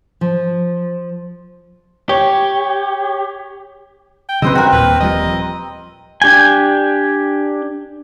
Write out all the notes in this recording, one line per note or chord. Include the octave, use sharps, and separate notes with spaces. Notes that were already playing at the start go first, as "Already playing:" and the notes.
F3
G4 C#5
G5
C#3 F#3 C4 B4 C5 D#5 E6
G2 C4 F#4 A#4
D#2 A#2 B4
D#1 F3 G3 D#5
D4 G4 G5 G#5